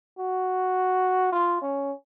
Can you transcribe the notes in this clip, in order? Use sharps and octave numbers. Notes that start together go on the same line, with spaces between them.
F#4
F4
C#4